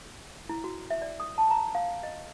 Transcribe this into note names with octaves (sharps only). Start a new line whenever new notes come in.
E4
F#4
E5
D5
D#6
A5
A#5
F5
D#5